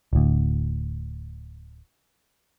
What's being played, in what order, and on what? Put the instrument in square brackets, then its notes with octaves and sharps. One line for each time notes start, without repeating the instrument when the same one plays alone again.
[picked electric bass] D1 D2